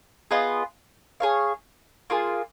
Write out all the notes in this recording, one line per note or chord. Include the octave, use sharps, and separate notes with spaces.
B3 F4 G#4 D#5
G#4 C#5 F5
A#3 F4 G#4